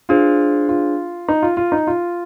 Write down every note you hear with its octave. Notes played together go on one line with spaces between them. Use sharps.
D4 F4 G#4 C5
F4
D#4
F4
F4
D#4
F4